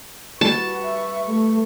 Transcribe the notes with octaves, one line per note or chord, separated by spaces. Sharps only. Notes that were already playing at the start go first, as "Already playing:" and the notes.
G3 F#4 B4 A5 C#6
E5
A3